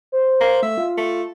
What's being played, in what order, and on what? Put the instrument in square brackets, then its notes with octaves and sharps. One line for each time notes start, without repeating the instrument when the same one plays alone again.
[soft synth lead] C5
[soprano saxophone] A#3
[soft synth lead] A3 [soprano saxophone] E5
[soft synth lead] F4
[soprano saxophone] A3